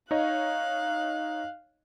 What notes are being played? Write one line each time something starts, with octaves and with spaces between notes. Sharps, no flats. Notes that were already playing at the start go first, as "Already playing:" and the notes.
D#4 C#5 D#5 F5 F#6